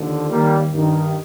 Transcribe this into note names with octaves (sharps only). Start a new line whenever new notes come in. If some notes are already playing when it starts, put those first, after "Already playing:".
Already playing: D#2 D3 F3
D#2 D#3 G3 A#3
G2 D#3